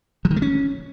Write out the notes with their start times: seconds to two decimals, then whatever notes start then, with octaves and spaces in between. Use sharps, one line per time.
0.25 F3
0.31 D#3
0.36 A3
0.42 C#4